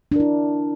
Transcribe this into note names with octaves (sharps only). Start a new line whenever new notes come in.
D4 E4 A#4